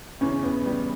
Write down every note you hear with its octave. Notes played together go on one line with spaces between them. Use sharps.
E2 C#3 C#4
E2 B3
G3 B3